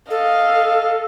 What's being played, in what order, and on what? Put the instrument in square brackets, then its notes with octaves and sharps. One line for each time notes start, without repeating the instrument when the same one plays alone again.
[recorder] A4 [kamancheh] D#5 F5